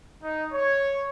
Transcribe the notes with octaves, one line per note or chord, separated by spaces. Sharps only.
D#4
C#5